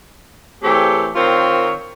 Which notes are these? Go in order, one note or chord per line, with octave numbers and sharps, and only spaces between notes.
E3 A3 C4 G4 G#4 C#5
D#3 C4 F4 A#4 C5 C#5